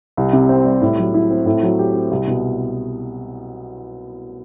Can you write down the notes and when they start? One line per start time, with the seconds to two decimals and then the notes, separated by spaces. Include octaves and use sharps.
0.17 C2
0.33 C3
0.49 C4
0.65 G3
0.82 A2
0.98 F#3
1.14 E4
1.31 C4
1.46 A2
1.63 F#3
1.79 G4
1.94 C4
2.11 C2
2.27 B2